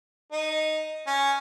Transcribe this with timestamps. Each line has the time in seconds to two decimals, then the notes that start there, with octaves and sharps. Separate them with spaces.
0.32 D#4
1.07 C#4